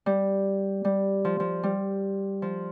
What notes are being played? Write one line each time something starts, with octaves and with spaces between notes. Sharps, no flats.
G3
G3
F3
F3
G3
F3